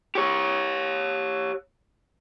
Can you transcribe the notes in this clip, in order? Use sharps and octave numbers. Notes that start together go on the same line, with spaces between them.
G4 C#5